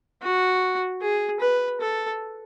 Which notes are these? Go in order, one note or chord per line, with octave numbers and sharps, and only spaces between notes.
F#4
G#4
B4
A4